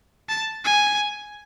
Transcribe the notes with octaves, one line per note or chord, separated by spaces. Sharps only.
A5
G#5